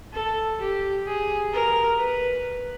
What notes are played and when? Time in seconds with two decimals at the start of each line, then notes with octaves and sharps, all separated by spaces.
0.13 A4
0.59 G4
1.06 G#4
1.53 A#4
1.98 B4